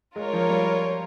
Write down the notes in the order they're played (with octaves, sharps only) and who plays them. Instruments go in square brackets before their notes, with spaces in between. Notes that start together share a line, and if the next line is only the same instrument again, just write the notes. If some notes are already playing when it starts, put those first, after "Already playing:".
[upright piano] G#3 [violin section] F4 A#4 C#5
[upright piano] F3
G3